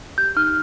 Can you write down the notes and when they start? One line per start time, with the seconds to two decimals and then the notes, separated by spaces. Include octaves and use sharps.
0.18 G4 G6
0.36 D#4 F6